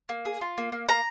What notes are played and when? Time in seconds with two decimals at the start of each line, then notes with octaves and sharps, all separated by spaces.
0.09 A#3
0.25 G#4
0.41 F4
0.58 A#3
0.72 A#3
0.89 A#3 A#5